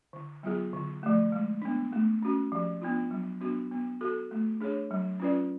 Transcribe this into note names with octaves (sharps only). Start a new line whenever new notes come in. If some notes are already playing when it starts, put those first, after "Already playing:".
D3
F#3 B3 F4 G#4
D3
F3 A3
G#3
B3 D4
A3
C#4 F#4
F3
B3 D4 F4
F#3
B3 D4 F#4
B3
F#4 A4
A3
D4 G#4 C#5
F#3
C#4 F4 B4 D5